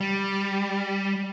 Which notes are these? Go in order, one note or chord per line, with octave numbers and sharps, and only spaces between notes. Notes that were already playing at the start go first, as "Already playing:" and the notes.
G3